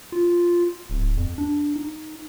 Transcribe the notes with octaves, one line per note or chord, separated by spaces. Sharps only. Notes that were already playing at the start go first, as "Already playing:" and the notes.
F4
D1
F2
D4
D#4